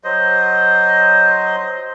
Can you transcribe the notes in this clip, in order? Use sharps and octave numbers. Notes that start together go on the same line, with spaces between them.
F#3 C5 D#5